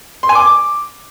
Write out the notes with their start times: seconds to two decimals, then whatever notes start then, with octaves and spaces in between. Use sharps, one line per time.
0.23 C6
0.29 G#5
0.35 D6